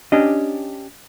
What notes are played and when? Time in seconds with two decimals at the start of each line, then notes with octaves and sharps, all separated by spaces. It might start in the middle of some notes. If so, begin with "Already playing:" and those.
0.12 C#4 D4 G4 D#5